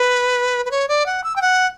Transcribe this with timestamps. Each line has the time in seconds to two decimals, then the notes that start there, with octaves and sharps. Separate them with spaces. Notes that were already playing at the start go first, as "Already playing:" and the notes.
Already playing: B4
0.65 B4
0.71 C#5
0.88 D5
1.06 F#5
1.24 E6
1.36 G5
1.41 F#5